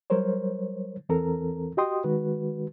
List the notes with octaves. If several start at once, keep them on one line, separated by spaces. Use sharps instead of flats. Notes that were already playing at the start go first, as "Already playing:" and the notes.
F#3 G3 A#4 C5 C#5
E2 E3 C4 A4 A#4 A#5
F#4 G4 D#5 G5 C6 D#6
D#3 G#3 F#4 B4